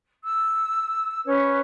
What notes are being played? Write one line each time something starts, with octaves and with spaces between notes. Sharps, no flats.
E6
C#4 B4 C#5